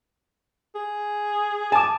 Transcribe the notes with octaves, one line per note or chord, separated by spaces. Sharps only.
G#4
G#5 A5 D6